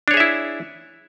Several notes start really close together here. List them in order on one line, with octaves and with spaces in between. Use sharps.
D4 C#5 G#4 E5 E4